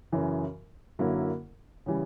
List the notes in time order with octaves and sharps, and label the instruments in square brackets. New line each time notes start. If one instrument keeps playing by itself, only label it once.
[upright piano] F#2 C#3 E3
F#2 D3 F#3 A#3 E4
C#3 E3 G3